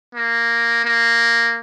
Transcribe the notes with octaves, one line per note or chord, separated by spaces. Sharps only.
A#3
A#3